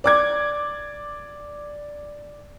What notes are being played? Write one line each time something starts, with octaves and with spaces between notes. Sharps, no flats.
D5 D6 G#6